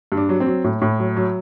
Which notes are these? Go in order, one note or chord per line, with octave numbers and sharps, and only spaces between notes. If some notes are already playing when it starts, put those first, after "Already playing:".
G2
D4
F#3
C4
F#3
A2
A2
F#3
F#3